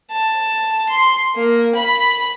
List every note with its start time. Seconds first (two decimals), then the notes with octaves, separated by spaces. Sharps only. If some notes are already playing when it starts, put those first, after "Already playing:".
0.11 A5
0.89 C6
1.36 A#3
1.75 B5